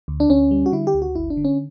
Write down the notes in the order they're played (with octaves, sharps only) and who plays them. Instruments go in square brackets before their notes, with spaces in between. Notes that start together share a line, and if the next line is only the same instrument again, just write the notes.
[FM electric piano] D2
D4
D2 C#4
G3
F#4
D3 E4
G4
D2
F#4
G1 E4
D4
D3
C#4